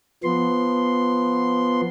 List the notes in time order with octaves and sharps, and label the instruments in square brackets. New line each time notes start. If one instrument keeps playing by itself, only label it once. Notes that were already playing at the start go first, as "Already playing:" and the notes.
[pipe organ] F3 B3 C6